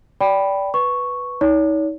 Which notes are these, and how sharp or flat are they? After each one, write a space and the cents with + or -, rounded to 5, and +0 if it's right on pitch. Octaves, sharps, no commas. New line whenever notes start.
D5 -20 G5 +0 B5 +0
B4 +0 C#6 +0
D#4 +35 C#5 +40